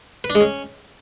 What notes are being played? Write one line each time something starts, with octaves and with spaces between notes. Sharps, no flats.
B4
D4
G#3
C#4